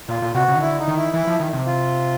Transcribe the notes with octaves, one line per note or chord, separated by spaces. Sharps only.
A#2 F4
A#2
C3 F#4
C#3
D#3
D3 E4
D#4
D#3
E4
E3 E4
F3
D#3
C3
F4